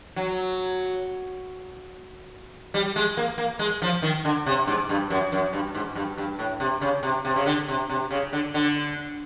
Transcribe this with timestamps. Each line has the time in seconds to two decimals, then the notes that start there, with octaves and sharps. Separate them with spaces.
0.16 F#3
2.74 G3
2.96 G#3
3.17 A#3
3.38 A#3
3.59 G#3
3.82 F3
4.02 D#3
4.25 D3
4.46 C3
4.67 G#2
4.89 G2
5.10 F#2
5.32 F#2
5.53 G2
5.75 G#2
5.95 G2
6.18 G2
6.39 A2
6.60 C3
6.81 C#3
7.03 C3
7.25 C3
7.36 C#3
7.46 D3
7.68 C3
7.90 C3
8.11 C#3
8.33 D3
8.54 D3